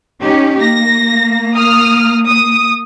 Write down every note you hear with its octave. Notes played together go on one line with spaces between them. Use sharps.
C#4 D#4 G4
A#3 A#6
D#6 F6
D#6